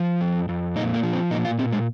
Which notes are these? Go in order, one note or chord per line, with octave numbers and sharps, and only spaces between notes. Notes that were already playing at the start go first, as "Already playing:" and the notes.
Already playing: F3
F2
F2
A#2 D#4
A#3
F3
C4
A#2 D#4
F4
A#2 C4
G#3